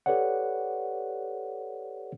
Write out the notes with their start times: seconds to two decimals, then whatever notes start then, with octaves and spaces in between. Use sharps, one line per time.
0.06 G4 A4 B4 C#5 D5 F#5